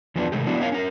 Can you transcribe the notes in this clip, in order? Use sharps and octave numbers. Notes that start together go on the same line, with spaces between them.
E2 F3 B3 D4
C3 D#3 G#3 A3 G4
F3 B3 D4 E4 F#4
B3 C#4 D#4 A#4 C#5 F5
C#4 A#4